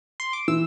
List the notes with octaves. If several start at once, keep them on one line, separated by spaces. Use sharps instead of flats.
C6
D6
E3 E6